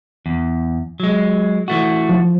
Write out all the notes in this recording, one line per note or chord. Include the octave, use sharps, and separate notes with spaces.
E2
F#3 G#3
E3 A3 F#4
F3